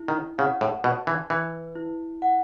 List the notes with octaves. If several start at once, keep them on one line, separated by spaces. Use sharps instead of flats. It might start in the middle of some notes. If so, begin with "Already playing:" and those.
Already playing: E4
D#3
C#3 F#5
A2
B2 A5
E3
E3 B4
E4
F#5